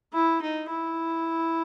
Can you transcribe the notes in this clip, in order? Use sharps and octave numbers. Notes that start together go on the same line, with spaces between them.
E4
D#4
E4